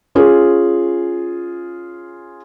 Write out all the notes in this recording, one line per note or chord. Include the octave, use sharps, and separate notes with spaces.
C#4 F4 G#4